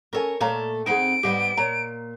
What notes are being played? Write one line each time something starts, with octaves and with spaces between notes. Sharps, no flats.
C#4 A4 A#4 C#5 G#5
A#2 A3 A4 C#5 F5 A#5
F2 C4 D#4 G#4 F#5 D7
G#2 G3 B3 G4 D#5
A#2 C#5 A#5